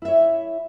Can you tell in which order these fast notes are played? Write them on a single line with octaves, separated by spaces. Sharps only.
E4 E5 C#5